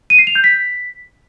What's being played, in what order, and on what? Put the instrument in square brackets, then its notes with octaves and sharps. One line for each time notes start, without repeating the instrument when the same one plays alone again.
[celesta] D#7
C7
F7
G6
B6